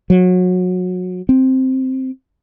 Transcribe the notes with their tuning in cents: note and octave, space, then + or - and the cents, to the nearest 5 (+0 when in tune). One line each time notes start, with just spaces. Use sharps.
F#3 -25
C4 +0